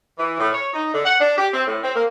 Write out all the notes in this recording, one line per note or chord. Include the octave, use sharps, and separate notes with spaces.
E3
A2
C#5
D#4
D3
F#5
D4
G4
C4
A2
C4
A#3